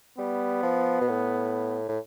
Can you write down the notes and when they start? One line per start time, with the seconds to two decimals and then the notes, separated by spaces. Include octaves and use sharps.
0.18 G3 B3
0.63 F3
1.02 B2
1.09 A2
1.89 A2